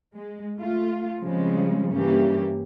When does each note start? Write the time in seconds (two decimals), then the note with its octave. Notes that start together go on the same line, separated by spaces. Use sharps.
0.15 G#3
0.59 A3 F4
1.21 C#3 F3 G3 G#3 C4
1.93 G2 E3 A#3 C#4 G4